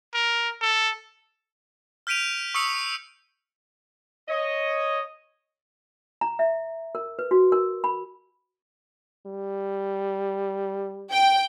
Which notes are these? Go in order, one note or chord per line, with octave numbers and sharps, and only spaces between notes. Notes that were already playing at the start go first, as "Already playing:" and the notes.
A#4
A4
F6 G6 B6 D7 D#7 F7
C#6 D#6 E6 C#7
C#5 D#5
A#5
E5
A#4
B4
F#4
A#4
B5
G3
G5